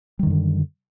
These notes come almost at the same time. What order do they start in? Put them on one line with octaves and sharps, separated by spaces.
G3 D#3 F#2 D3